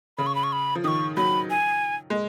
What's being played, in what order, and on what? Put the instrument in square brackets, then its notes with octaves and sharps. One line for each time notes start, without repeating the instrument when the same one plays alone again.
[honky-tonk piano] C#3 [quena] B5
[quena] C#6
B5
C#6
B5
[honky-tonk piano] F3
[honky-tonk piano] D#3 [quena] C#6 D#6
[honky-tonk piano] F#3 [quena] B5
[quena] G#5
[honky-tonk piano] G#3